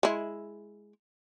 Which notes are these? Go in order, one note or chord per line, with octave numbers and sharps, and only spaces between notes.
G#3 E4